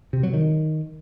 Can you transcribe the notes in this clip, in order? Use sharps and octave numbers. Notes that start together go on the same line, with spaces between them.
C3
F#3
D#3